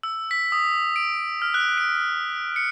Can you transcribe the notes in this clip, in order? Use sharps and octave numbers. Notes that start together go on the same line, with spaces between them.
E6
B6
D#6
D7
F6
F#6
D7
C#7